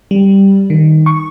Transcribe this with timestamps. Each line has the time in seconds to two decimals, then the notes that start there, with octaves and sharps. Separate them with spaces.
0.11 G3
0.70 D#3
1.06 C#6